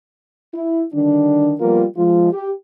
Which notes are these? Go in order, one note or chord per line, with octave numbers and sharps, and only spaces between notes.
E4
D3 D#3 G3 D4
F3 G3 A#3 B3 F4 A#4
F3 G#3 F4
G4